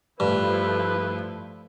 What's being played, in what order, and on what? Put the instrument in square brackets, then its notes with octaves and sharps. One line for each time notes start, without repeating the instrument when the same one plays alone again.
[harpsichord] G2 [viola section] F3 A3 E4 [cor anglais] B4